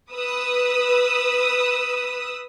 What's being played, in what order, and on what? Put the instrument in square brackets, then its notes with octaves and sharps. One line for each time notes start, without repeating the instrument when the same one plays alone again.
[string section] B4 D#6 E6